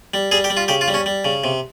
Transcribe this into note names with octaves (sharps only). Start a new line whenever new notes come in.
G3
G3 G#4
G4
G3
F4
C#3 G4
F4
G3
C#4
G3
C#3
C3